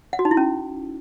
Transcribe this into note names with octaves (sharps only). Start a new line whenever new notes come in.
F#5
F#4
D#4
E4
C#4